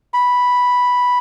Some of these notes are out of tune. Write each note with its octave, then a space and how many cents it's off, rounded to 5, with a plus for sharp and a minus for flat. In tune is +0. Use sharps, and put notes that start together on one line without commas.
B5 -5